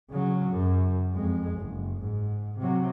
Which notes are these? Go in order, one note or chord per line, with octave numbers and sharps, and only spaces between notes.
C#3 F#3
F#2
F2 G#3
F#1
G#2
C3 F#3